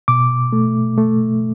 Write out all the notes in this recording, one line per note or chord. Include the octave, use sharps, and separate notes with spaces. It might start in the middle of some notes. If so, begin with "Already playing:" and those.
B2 D6
A3
A3